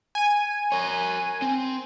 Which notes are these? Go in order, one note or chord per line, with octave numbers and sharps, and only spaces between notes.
G#5 D#7
A#4 C#5
C4